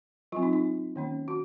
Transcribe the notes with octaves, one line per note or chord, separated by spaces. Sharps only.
F#3 C4 F4
D#4
D#4
D#3 A#3 C#4
F#4